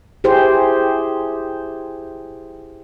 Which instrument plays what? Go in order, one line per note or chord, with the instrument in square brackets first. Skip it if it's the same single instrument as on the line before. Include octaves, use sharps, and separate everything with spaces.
[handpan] E4 G4 G#4 C5